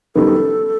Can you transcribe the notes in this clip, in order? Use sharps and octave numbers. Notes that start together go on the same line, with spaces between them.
F#2 D#3 G3 B3 D#4 A4